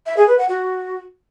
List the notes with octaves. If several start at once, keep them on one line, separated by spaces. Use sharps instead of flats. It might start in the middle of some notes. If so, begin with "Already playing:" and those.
E5
G#4
B4
F#5
F#4